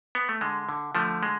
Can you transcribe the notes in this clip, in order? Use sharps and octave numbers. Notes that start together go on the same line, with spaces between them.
B3
A3
D3 G#3
D3
D3 F3 A3
G#3